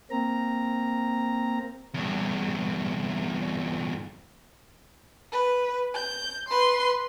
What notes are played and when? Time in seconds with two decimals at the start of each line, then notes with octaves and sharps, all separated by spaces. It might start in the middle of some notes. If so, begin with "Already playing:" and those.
0.10 A#3 C4 A#5
1.94 E2 G2
5.32 B4
5.95 G6
6.49 B4 C6